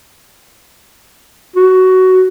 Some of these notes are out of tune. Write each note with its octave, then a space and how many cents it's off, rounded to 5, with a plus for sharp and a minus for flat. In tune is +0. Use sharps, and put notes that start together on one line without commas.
F#4 +15